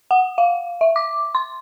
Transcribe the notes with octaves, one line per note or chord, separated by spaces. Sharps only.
F#5
F5
E5
D6
C6